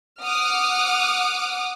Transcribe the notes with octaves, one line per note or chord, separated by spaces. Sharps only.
F#5 D6 D#6 F6